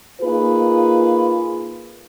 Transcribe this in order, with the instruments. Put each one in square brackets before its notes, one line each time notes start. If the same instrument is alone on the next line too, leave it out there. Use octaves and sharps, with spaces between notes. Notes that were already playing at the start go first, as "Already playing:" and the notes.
[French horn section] A#3 D#4 F4 G#4 B4